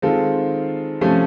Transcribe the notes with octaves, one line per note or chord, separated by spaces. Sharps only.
D#3 G#3 C4 F4 A4
C3 F3 A3 C#4